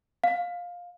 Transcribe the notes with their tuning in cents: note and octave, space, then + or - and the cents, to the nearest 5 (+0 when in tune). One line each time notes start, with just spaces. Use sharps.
F5 +15